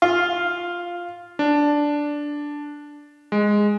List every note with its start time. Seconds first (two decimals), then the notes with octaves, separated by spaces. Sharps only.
0.02 F4
1.39 D4
3.32 G#3